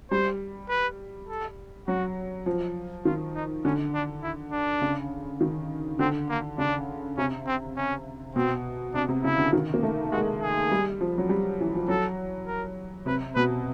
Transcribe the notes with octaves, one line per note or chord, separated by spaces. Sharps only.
G3 C5
B4
A4
F#3 F#4
F3
D#3 F4
D#4
D3 C#4
D4
E4
D4
C#3
D#3
D3 C4
A#3
C#3 D4
C3 C#4
C4
C#4
B2 C4
C3 D4
C3
C#3 E4
D3
D#3
A#3
A3
G#3 F#4
G#4
G3
F3
F#3
G3
E3
F3
F#3 A4
A#4
C3 B4
B2 B4